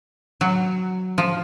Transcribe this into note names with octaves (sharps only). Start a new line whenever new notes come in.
F#3
F3